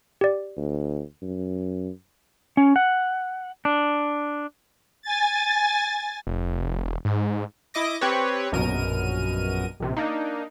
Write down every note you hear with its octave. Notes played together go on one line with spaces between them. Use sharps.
G4 D5
D2
F#2
C#4
F#5
D4
G#5 A6
F1
E1
G#2
E4 D#5 D6 A#6
C4 G4 B4 C#5
A#1 F#2 B2 A#4 D#7
A#1 C3
A#3 D4 D#4